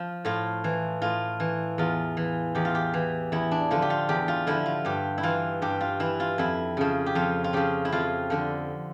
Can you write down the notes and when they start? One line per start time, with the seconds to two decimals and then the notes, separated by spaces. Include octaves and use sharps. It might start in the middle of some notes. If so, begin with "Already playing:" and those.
Already playing: F3
0.25 A2 F4
0.64 E3
1.02 A2 F4
1.40 E3
1.78 E2 F4
2.17 E3
2.55 E2 G4
2.65 F4
2.75 G4
2.94 E3
3.32 E2 E4
3.51 D4
3.71 D3 F3 F4
3.82 G4
3.90 F4
4.09 E2 G4
4.28 F4
4.47 D3 F3 E4
4.66 F4
4.85 G2 G4
5.18 E4
5.23 E3 F4
5.62 G2 G4
5.81 F4
6.00 E3 E4
6.20 F4
6.38 F2 E4
6.77 C#3 F3
7.06 G4
7.15 F2 F4
7.44 F4
7.53 C#3 F3 G4
7.85 E4
7.92 F2 F4
8.30 D3 F3